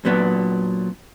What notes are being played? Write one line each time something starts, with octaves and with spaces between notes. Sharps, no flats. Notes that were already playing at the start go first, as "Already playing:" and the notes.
A#2 F#3 B3 D4